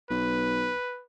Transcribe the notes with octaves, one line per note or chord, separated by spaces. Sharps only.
B1 B4